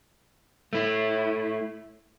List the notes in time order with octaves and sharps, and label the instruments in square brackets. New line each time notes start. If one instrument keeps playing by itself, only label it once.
[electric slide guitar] A3 E4